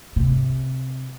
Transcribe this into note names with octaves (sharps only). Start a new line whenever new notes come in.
C3